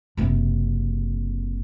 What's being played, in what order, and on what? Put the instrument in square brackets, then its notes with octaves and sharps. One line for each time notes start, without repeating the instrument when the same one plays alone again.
[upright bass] F#1 C3